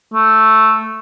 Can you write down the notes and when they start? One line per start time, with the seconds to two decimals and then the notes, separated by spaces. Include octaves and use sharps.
0.14 A3